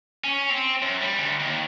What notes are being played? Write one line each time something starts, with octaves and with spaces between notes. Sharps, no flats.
C#4
C4
F#2
G3
D2
D#2